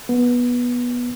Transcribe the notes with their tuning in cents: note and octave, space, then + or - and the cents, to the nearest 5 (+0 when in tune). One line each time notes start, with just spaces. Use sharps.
B3 -15